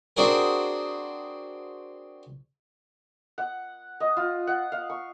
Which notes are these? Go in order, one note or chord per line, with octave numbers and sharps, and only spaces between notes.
C4 D4 F#4 G#4 A#4
F#5
D#5
F4
F#5
F5
C#6